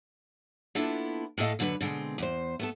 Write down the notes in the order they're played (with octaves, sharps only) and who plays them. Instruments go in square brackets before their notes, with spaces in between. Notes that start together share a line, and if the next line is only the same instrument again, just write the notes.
[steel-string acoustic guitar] A#3 B3 D4 E4 F4 A4
A2 A3 G#4 A4 D#5 F5
F2 D3 F#3 F4 B4
B2 D3 G#3 C4
E2 C5
A3 B3 A4